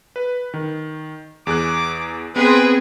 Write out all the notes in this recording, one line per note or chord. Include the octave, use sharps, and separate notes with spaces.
B4
D#3
E2 G#4 D6 F#6
B3 C4 G#4 B4